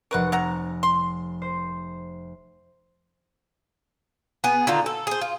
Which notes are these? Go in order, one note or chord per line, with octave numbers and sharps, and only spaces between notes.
F1 A#4 B4 F#5 C#6
C3 F#5 A#5
C6
C5
B3 G#4
D3 D#3 D#4 F4
A4
G#4 C5
F4